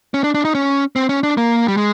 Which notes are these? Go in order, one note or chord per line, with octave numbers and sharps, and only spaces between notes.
C#4
D4
D4
D#4
C#4
C4
C#4
D4
A#3
G3
G#3